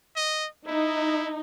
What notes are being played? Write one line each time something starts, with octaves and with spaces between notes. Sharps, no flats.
D#5
D#4 E4